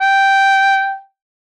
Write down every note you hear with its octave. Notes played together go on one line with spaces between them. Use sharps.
G5